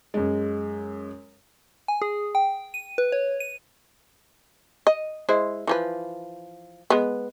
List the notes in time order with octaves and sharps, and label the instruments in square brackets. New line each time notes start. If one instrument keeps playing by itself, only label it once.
[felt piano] F#2 G#3
[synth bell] G#5
G#4
G5
D#7
B4
C#5
D#7
[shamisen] D#5
G#3 E4 C5
E3 F3 B4
G#3 B3